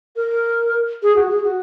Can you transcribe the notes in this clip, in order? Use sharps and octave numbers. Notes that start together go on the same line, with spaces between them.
A#4
G#4
F#4
G#4
F#4